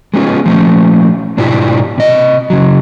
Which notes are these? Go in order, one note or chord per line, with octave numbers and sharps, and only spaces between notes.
G#3 B3 C#4 F4
F3 A3 C#4
G#2 B2 D4 E4 F4 G4
C3 D#5
C#3 F#3